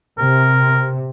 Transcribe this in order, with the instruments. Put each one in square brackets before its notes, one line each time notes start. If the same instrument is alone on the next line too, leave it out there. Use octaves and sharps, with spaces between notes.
[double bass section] C3 [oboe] A#4